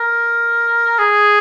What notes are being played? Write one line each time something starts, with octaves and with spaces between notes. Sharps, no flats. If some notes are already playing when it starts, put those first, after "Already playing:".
Already playing: A#4
G#4